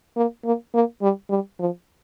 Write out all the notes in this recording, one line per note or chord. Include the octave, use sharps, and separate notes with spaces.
A#3
A#3
A#3
G3
G3
F3